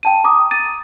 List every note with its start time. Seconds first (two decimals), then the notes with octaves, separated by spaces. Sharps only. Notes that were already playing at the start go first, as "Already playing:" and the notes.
0.03 G5 A5 D#7
0.24 A#5 D6 D#6
0.51 A6 D#7